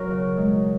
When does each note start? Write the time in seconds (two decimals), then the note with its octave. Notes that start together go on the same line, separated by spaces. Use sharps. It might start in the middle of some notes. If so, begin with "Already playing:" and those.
Already playing: F#2 B2 F#3 A#4
0.11 C#3
0.37 G#3